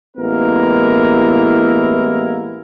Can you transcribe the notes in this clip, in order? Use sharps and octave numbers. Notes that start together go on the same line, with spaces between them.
A1 G#3 A#3 B3 E4 A#4